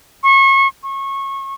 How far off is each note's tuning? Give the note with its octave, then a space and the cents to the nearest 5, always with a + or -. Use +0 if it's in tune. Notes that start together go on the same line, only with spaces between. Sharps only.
C#6 -30
C#6 -25